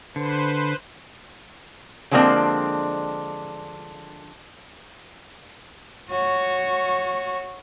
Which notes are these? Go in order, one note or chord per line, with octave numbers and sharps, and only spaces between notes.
D3 B4 C5
D3 F3 G#3 A#3 C4 D4
F#4 C#5